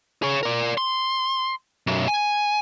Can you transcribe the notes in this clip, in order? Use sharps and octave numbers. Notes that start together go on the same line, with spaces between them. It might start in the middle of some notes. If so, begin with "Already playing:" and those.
G#4 C#5
A#4 D5
C6
B1 F#2
G#5